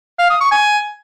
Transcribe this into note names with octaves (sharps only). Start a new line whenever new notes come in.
F5
D#6
C#6
G#5